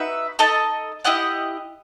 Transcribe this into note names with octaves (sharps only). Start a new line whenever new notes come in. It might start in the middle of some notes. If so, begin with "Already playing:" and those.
Already playing: D#4 F#4 B4 E5
D#4 A4 D#5 A5
E4 G4 D#5 F#5